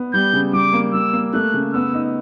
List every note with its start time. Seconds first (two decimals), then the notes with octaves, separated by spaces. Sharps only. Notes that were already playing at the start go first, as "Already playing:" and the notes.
Already playing: B3
0.13 G3 G6
0.33 C#3
0.53 G3 D6
0.73 A#3
0.93 G3 E6
1.13 A#3
1.33 A3 F#6
1.54 C#3
1.73 B3 E6
1.93 D#4